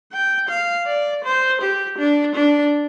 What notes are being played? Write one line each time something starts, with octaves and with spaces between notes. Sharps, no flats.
G5
F5
D5
C5
G4
D4
D4